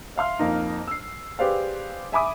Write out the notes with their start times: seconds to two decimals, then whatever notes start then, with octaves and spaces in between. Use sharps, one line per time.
0.16 E5 F5 C6 F6
0.39 F2 A#3 D#4
0.88 E6 C7
1.39 G4 G#4 B4 C5 D5 F5
2.12 E5 G#5 B5 D6 D#6